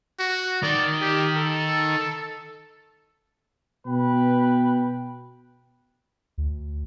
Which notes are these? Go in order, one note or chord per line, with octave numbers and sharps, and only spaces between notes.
F#4
D#3 D5
G4
A4
B2 B4 G5
D2